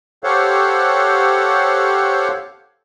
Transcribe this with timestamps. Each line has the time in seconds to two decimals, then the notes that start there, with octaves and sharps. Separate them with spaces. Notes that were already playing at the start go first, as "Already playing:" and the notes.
0.24 G4 A4 C5 C#5 F5 F#5